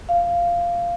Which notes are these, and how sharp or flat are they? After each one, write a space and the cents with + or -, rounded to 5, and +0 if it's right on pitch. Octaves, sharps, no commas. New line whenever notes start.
F5 -10